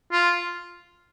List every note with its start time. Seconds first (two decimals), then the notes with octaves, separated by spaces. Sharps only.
0.12 F4